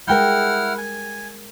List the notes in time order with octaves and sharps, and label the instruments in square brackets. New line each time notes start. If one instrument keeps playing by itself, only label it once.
[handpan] G3 G#3 [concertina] E4 F#5 F6 [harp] A#4 G5 G6
[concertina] G#5